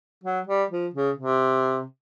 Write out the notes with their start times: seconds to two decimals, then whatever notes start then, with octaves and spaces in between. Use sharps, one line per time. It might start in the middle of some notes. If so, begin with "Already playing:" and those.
0.23 F#3
0.47 G3
0.71 F3
0.94 C#3
1.17 C3